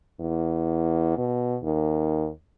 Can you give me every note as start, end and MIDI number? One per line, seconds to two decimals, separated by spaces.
0.20 1.14 40
1.17 1.57 47
1.63 2.28 39